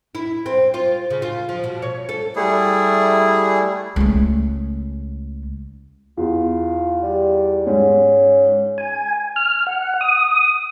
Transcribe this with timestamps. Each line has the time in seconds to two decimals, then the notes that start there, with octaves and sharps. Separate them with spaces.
0.15 E4
0.46 C4
0.74 F4
1.10 C#3
1.22 F4
1.49 F3
1.64 B2
1.82 C#5
2.09 A4
2.36 G3 A3 E4 G#4
3.96 C#2 A3
6.18 E2 F4
7.03 G3
7.67 G#2 C#4
8.78 G#5
9.36 F6
9.67 F#5
10.01 D#6